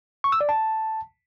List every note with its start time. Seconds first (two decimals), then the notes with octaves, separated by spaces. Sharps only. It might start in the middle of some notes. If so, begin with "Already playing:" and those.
0.24 C#6
0.32 E6
0.41 D5
0.49 A5